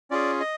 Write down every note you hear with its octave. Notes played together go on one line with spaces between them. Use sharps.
C#4 F4 G#4 D5
D#5